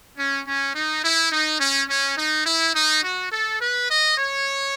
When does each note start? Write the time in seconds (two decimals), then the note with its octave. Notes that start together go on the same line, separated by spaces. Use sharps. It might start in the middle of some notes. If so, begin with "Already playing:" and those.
0.18 C#4
0.46 C#4
0.75 D#4
1.04 E4
1.32 D#4
1.60 C#4
1.89 C#4
2.17 D#4
2.46 E4
2.75 D#4
3.04 F#4
3.32 A4
3.61 B4
3.90 D#5
4.18 C#5